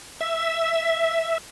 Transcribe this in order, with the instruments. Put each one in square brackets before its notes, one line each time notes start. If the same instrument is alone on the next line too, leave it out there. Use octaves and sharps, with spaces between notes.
[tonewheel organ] E5